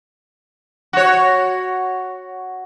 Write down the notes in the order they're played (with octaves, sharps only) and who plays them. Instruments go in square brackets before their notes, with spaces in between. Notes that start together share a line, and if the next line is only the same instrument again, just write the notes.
[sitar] F#4 C#5